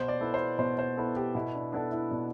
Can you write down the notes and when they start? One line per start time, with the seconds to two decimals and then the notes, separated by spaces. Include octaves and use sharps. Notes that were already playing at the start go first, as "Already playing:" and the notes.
Already playing: B2 C5
0.08 D5
0.21 B3 E4 A4
0.34 C5
0.58 B2 C5
0.79 C5
0.97 B3 E4 A4
1.16 G4
1.35 B2 E4
1.55 D4
1.72 B3 D4 E4 A4
1.91 E4
2.11 B2 D4